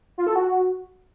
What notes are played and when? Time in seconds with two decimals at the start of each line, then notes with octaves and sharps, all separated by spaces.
0.18 F4
0.27 A4
0.36 F#4